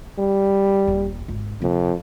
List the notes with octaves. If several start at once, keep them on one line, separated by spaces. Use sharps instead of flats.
G3
D#1
G#1
F2 C3